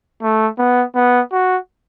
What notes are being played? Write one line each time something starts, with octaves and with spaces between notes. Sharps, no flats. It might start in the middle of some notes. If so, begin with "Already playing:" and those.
A3
B3
B3
F#4